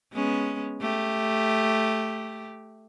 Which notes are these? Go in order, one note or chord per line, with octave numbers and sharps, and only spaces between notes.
G#3 B3 C#4
A3 G4